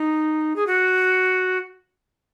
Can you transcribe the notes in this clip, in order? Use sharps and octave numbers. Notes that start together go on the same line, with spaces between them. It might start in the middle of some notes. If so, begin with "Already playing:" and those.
Already playing: D#4
G#4
F#4